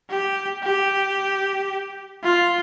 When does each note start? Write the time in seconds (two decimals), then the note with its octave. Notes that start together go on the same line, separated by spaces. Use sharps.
0.10 G4
0.63 G4
2.23 F4